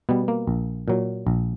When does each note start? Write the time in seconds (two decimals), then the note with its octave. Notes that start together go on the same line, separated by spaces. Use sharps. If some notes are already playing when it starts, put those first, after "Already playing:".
0.09 B2 G3 B3
0.28 A#3
0.47 A#1
0.88 A#2 F#3
1.27 A#1